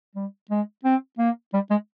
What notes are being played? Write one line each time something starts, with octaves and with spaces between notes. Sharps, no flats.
G3
G#3
C4
A#3
G3
G#3